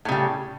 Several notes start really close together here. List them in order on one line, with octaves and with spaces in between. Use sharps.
A2 C#3 G3